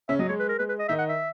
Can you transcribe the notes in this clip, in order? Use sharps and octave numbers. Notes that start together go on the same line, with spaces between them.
C#3 C#4 E5
F#3 D#5
G#3 C#5
B4
A#4
G#3 B4
B4
D#5
D#3 D#4 E5
F#5
E5